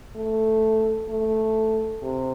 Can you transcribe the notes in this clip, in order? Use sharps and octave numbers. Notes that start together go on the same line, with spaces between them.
A3
A3
C3